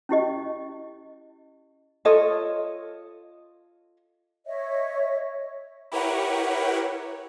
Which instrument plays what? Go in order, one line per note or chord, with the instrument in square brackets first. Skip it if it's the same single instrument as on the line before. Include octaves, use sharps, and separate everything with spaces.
[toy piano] C#4 E4 G4 D#5
[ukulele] F4 A4 C#5 D#5
[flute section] C#5 D#5 E5
[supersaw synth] E4 G4 A#4 B4 C#5 F#5